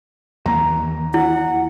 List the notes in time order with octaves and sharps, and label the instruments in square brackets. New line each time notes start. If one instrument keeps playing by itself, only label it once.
[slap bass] D#2 E3 A#3 [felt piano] A#5
[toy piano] E4 [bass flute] F#5